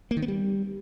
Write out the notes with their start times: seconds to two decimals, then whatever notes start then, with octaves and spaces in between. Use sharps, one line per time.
0.11 A#3
0.17 D#3
0.22 B3
0.28 G3